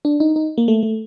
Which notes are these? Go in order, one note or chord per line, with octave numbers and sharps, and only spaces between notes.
D4
D#4
D#4
A#3
A3
A3